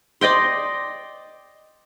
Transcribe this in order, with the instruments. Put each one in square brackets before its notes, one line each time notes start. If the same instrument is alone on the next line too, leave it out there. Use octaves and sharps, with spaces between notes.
[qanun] D5 D#5 G5 C6